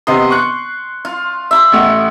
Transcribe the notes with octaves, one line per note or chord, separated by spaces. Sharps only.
C3 B3 D#5 C6
C#6 F#6 C#7
F4
E5 B5 C6
A1 A3 F#5